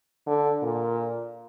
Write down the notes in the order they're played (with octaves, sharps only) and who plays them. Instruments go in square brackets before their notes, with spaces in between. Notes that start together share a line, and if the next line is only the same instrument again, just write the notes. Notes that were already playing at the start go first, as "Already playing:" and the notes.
[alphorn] D3
A#2